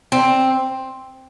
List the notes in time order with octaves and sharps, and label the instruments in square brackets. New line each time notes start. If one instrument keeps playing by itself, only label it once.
[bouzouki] C4